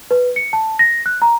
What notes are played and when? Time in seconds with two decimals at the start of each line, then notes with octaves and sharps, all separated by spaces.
0.11 B4
0.36 C#7
0.53 A5
0.79 A#6
1.06 F#6
1.22 A#5